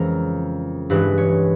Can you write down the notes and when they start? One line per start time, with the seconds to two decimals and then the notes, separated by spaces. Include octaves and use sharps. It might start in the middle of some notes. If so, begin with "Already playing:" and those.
Already playing: F2 C#3 E3 G#3 A#4
0.90 G2 E3 G#3 B4
1.18 C#5